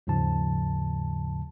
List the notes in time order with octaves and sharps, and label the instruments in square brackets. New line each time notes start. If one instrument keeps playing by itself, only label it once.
[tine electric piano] D#2 G#2 C#3 F3 A5